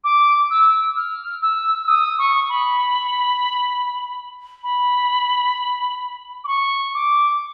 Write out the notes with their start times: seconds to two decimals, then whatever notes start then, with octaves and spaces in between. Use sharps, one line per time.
0.04 D6
0.50 E6
0.96 F6
1.42 E6
1.83 E6
1.88 D#6
2.18 C#6
2.49 B5
4.63 B5
6.44 D6
6.47 C#6
6.94 D6